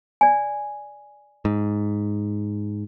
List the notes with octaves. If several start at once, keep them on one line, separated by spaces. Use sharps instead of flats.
D5 G#5
G#2